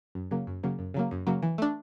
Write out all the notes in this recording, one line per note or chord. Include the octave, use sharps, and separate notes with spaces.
F#2
C#3 F#3 A#3
F#2
C#3 F#3 A#3
F#2
C#3 F#3 A#3
F#2
C#3 F#3 A#3
E3
A3 D4